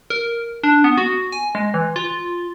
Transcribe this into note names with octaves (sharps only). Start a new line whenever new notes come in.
A#4
D4
B3
F#4
G#5
G#3
E3
F4